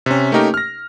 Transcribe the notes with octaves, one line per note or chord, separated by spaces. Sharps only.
C3 C#4
A3 A#3 C#4 D#4 G4 A#4
F6 A#6